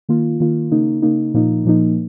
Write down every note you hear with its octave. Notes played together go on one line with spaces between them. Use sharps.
D#3 A#3 F4
D#3 A#3 F4
C#3 A#3 D#4
C#3 A#3 D#4
A#2 F3 A#3 D#4
A#2 F3 A#3 D#4